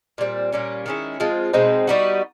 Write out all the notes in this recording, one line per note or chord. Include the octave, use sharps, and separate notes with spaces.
A#2 G3 C4
A#2 G3 A#3 C#4
D#3 G#3 C#4 E4
F3 G#3 C4 F4
B2 G#3 C4 D#4
G3 B3 D#4 F#4